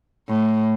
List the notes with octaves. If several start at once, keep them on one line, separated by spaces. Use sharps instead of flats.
A2